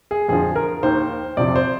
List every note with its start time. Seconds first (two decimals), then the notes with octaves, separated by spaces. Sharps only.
0.11 G#4
0.28 F2 D3 F3 G#4
0.56 A#4
0.83 D#2 D#3 C5
1.37 F2 C3 F3 D5
1.56 C5